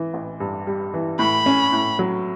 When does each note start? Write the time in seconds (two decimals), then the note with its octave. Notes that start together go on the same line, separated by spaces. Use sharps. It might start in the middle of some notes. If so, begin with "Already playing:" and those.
Already playing: E3
0.13 A1
0.40 G2
0.67 G3
0.94 E3
1.19 A2 B5
1.46 C#4
1.73 A2
1.99 F#3